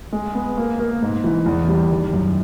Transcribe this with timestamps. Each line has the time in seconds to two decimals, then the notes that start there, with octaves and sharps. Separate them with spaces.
0.13 G#3
0.35 B3
0.57 A#3
0.79 A#3
1.02 G#2
1.24 E3
1.46 E2
1.68 G3
1.91 D#3
2.13 F#2